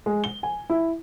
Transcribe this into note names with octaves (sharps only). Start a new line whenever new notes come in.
G#3
G7
G#5
E4